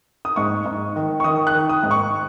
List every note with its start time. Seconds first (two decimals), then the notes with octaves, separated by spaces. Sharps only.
0.25 D#6
0.36 G#2 C#6
0.66 G#2
0.96 D#3
1.20 C#6
1.24 D#3 D#6
1.47 F#6
1.55 D#3
1.69 D#6
1.83 G#2
1.91 C#6